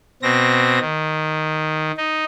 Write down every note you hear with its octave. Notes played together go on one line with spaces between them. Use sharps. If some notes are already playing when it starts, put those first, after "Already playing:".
B2 C4 A#6
D#3
D#4